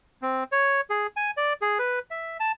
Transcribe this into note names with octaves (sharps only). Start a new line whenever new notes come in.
C4
C#5
G#4
G#5
D5
G#4
B4
E5
A5